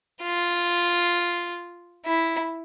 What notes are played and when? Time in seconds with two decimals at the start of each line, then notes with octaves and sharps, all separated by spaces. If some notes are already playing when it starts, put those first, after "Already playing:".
0.23 F4
2.06 E4